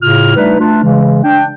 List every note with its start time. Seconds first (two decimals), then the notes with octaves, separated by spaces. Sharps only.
0.02 A2 C#3 F4 F6
0.36 G3 A3 D4 D#4 B4
0.59 A3 D4 F4
0.83 C#3 E3 G#3
1.24 D4 G5